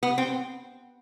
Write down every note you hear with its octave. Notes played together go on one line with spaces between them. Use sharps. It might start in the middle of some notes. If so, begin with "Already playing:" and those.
B3
C4